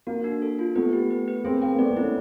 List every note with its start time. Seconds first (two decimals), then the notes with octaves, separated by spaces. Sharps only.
0.07 A#3 F#4
0.24 D4
0.42 A4
0.59 F4
0.76 A3 B3 B4
0.93 G4
1.11 B4
1.28 B4
1.44 A#3 C4 G#4
1.62 A#3 G5
1.75 A#3
1.79 A3 B3 D5
1.90 A3 B3
1.97 E4
2.02 B3 C#4